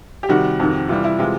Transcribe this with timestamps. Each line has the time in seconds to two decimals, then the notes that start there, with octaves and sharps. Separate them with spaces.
0.23 G4
0.29 C3 D#3 G3 F#4
0.60 F2 C3 D#3
0.89 C3 E3 G3 F4
1.04 E4
1.19 C3 E3 G#3 F4